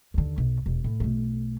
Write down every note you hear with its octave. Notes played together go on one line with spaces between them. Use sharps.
D#2 D3
B1
E1
A2
B1 A3